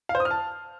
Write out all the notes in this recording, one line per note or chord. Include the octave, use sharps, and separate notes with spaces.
F5
C5
D#6
F6
A5